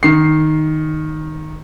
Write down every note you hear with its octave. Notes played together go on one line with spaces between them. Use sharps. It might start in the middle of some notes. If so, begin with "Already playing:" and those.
D#3 C7